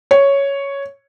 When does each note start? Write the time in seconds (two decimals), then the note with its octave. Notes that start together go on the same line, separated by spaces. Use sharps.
0.11 C#5